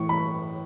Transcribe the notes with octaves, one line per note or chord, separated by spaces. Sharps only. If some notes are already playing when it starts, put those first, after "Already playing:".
Already playing: A2 E3 C#6
B5